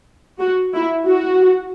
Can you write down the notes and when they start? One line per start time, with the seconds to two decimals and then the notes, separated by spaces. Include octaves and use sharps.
0.39 F#4
0.74 E4
1.06 F#4